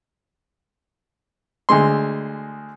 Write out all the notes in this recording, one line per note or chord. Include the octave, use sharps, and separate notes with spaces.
D2 D3 G#3 C6